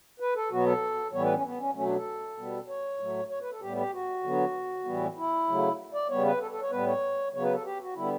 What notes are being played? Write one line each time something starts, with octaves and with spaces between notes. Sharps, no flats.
B4
A4
B2 F#3 B3 F#4
A4
A2 E3 G3 B3 C#5
B4
C#4
B3
C#4
B2 F#3 A3 C#4
D4
A4
B2 G3 B3
C#5
A2 F#3 A3
C#5
B4
A4
A2 G3 B3 G4
G4
F#4
D3 F#3 B3
A2 E3 G3 B3
E4
C#3 F#3 A3
D5
C#3 G3 B3 C#5
B4
A4
A4
C#5
A2 G3 B3 B4
C#5
C#3 F#3 B3 C#5
B4
A4
G4
F#4
D3 G3 B3 E4